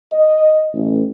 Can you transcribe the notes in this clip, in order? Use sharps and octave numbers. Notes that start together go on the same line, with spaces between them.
D#5
A1